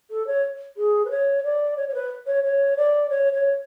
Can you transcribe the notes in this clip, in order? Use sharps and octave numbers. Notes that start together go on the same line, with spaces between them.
A4
C#5
G#4
B4
C#5
D5
C#5
C#5
B4
C#5
C#5
D5
C#5
C#5